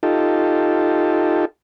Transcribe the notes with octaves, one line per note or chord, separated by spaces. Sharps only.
D#4 F4 G4 A4